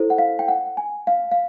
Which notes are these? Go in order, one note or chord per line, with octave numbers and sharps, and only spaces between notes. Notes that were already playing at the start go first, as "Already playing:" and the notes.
Already playing: E4 A4 C5
F#5
F5
G5
F#5
G#5
F5
F5